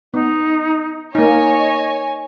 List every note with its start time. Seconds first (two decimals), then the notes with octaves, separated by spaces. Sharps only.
0.14 B3 D#4
1.15 A#3 D#4 C#5 D#5 G#5